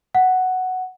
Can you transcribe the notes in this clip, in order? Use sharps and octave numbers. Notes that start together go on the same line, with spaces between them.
F#5